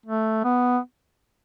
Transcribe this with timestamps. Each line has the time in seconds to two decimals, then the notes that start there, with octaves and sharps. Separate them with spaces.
0.06 A3
0.44 B3